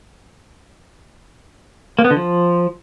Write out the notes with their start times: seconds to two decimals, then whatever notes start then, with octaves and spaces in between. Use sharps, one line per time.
1.99 A#3
2.05 B3
2.11 D3
2.17 F3